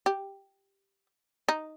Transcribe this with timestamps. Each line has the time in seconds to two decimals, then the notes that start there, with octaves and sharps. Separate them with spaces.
0.06 G4
1.48 D#4